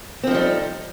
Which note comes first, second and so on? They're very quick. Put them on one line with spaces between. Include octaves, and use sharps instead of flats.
C4 F3 D#4 G3 A4